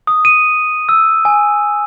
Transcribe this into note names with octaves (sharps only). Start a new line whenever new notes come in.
D#6
D#7
E6
G#5